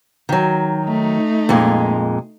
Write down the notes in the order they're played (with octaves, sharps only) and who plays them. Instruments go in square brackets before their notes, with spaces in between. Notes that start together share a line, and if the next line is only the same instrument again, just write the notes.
[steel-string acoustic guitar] D#3 F#3
[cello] A3 D#4
[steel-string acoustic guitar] F2 A#2 G#3